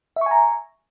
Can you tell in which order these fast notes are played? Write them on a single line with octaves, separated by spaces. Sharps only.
E5 C#6 G#5 A#5